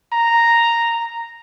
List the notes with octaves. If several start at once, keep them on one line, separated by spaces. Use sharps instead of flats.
A#5